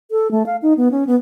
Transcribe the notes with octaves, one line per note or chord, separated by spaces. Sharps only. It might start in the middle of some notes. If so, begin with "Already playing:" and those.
A4
A3
F5
D#4
B3
C#4
B3